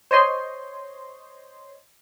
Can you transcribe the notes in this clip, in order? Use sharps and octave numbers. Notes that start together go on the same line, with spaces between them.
C5 C#5 D#5 C6